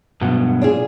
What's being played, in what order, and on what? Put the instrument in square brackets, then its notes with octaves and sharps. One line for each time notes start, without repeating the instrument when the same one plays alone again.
[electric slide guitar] G2 B2 F#3
[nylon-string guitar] D4 F4 G#4